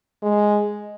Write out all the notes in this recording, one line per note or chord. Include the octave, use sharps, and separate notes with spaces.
G#3